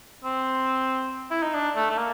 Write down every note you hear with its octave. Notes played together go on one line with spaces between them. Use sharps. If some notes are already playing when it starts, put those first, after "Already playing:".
C4
E4
D#4
D4
A3
A3
A#3